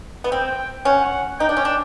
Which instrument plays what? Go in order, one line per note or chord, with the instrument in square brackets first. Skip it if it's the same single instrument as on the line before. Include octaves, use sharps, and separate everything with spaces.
[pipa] B3
[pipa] C4 [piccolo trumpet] G5
[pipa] C#4 [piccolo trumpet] F#5
[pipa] D#4 [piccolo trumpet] G5
[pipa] D4
C#4
D4